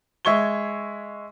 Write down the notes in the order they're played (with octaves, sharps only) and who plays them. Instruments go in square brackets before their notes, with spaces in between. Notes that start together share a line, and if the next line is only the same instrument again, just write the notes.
[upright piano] G#3 E5 C#6 G#6 G7